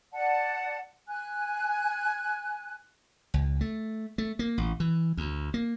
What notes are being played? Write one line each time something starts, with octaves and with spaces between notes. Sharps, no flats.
D5 F#5 A5
G#5 F#6
C#2
A3
A3
A#3
A1
E3
D2
A#3